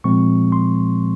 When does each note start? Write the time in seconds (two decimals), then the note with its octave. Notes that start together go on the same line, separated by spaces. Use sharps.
0.04 A#2 F3 G#3 C4 C#6
0.52 C6